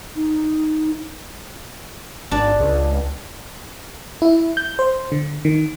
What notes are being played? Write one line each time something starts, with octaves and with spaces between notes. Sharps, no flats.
D#4
G#1 D4
C#2
E4
G6
C5
D3
D#3